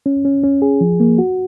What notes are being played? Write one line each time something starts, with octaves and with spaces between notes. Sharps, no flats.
C#4
C#4
C#4
G#4
F3
A#3
F#4